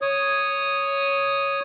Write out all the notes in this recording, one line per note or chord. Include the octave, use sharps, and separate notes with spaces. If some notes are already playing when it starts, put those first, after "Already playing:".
C#5 D#6